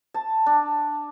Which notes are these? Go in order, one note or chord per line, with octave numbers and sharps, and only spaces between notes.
A5
D4